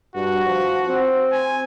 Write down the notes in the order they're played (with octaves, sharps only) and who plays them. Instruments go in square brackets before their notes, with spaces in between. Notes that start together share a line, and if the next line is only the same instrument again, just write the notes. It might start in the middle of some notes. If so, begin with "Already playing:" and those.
[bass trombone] G2 [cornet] F#4
[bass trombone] F3
C4
[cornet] G#5